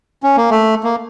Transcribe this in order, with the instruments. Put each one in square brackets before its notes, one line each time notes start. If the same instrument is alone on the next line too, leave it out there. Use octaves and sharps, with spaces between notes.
[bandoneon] C#4
A#3
A3
A#3